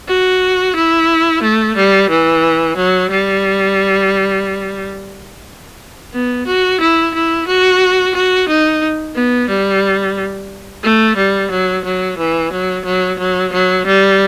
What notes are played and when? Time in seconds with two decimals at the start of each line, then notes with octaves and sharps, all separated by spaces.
0.08 F#4
0.75 E4
1.43 A3
1.76 G3
2.10 E3
2.77 F#3
3.11 G3
6.13 B3
6.46 F#4
6.80 E4
7.14 E4
7.47 F#4
8.15 F#4
8.48 D#4
9.15 B3
9.49 G3
10.83 A3
11.17 G3
11.51 F#3
11.84 F#3
12.18 E3
12.52 F#3
12.85 F#3
13.19 F#3
13.52 F#3
13.86 G3